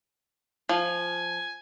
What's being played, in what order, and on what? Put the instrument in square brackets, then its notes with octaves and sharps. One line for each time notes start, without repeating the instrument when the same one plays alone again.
[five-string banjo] F3 [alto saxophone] G#5